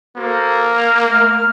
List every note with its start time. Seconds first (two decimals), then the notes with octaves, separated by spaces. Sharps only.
0.17 A#3 F#4 A4 C5
0.75 F6
1.07 A3 F6